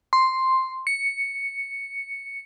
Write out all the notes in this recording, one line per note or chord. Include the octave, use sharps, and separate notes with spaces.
C6
C#7